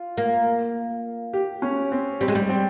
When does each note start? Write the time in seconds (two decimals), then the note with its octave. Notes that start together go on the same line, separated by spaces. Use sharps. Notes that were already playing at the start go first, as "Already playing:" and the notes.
Already playing: F4
0.17 A#3
1.33 G4
1.62 C#4
1.92 C4
2.21 G3 C4
2.28 G#3
2.35 G3
2.49 C4